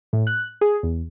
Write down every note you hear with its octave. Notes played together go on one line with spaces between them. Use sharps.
A2
F#6
G#4
E2